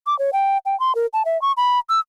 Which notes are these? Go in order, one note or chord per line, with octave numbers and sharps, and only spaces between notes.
D6
C#5
G5
G5
C6
A#4
A5
E5
C#6
B5
E6